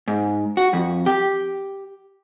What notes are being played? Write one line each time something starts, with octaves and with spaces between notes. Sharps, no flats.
G#2
F#4
F2
G4